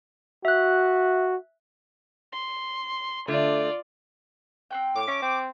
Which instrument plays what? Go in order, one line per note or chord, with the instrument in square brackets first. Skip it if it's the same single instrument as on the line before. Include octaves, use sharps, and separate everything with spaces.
[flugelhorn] F#4 [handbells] E5 F#6
[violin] C6
[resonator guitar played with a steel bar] D3 A3 [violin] F4 D5
[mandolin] C4 F#5 G5
[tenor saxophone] A2 [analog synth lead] D6
[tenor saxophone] C#4 [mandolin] E5 A5 C#6
[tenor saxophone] C4